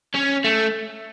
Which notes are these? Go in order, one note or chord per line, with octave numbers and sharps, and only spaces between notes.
C#4
A3